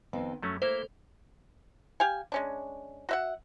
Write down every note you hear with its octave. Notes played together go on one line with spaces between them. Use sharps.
F2 D#3 B3 C4
F#2 F#3 A3 C#4
A3 A#3 E4 C5 E5
G4 F5 G#5
G#3 C#4 D4
F#4 E5 F#5